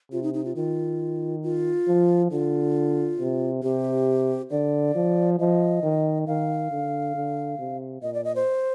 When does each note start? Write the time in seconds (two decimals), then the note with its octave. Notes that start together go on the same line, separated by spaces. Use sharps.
0.12 C3 F4
0.23 D#4
0.34 D#4
0.45 F4
0.56 D#3 F4
1.43 F4
1.88 F3
2.31 D3 F4
3.20 C3
3.63 C3 G4
4.51 D3 D5
4.95 F3
5.39 F3 D#5
5.83 D#3
6.27 D#3 F5
6.71 D3
7.15 D3
7.59 C3
8.02 A#2 D#5
8.14 D5
8.24 D#5
8.36 C5